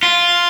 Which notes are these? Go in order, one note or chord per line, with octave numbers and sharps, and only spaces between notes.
F4